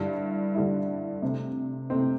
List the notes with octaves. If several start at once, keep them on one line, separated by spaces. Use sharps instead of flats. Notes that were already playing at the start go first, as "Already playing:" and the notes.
Already playing: G2 D3 G3 E4
G2 D3 G3 E4
C3 A3 C4
C3 A3 C4